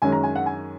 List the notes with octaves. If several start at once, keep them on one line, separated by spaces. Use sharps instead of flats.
F#2 D#3 G#3 C#4 G#5
A#5
G#5
F#5
G#5